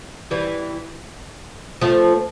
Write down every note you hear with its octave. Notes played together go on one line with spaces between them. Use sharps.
E3 G3
F3 A3